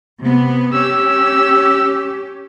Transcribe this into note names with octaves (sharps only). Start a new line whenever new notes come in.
C3 B3
C#4 G4 E6